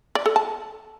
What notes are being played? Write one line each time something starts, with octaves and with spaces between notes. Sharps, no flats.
D5
A4
A5